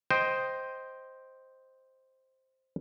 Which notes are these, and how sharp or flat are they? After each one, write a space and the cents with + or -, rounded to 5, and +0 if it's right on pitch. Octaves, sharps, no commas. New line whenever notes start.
C5 +0 D#5 +0 G5 +0